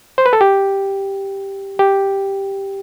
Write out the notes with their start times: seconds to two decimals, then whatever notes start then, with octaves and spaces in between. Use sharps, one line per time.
0.18 C5
0.26 B4
0.33 A4
0.41 G4
1.79 G4